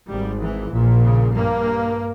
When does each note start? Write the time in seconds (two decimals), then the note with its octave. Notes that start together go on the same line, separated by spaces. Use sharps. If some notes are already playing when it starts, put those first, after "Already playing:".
0.09 G#1 G#2 G3
0.41 E3
0.72 A#1 A#2
1.04 C#3
1.35 G2 A#3